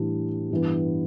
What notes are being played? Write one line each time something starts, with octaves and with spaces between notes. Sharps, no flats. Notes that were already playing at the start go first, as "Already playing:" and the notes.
Already playing: A2 E3 G3 D4
G2 E3 B3